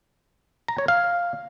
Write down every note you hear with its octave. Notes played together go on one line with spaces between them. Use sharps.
A#5
C#5
F5